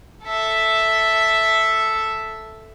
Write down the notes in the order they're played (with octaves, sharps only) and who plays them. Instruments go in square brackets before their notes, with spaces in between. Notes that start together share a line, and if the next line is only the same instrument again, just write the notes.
[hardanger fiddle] A4 E5